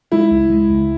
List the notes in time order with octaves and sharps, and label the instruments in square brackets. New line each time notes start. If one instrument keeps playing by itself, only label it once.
[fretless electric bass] G#3 [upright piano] E4
[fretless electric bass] C#2
G#3
C#2